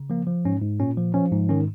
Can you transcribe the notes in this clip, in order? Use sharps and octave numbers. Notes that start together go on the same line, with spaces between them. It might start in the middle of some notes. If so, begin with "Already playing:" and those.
Already playing: C#3
F3 A#3
F3
G#2 C#4
G#2
A#2 C#4
F3
F3 C#4
G#2
D#3 C#4